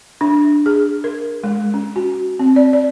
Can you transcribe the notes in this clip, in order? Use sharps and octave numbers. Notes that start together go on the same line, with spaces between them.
D4
G#4
A#4
G#3
C#4
F#4
C4
D5
D5